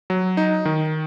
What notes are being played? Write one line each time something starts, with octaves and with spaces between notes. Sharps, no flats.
F#3
D#4
D#3